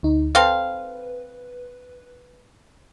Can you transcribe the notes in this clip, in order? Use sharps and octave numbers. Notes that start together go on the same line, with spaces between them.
D2 D#4
C4 A4 B4 F5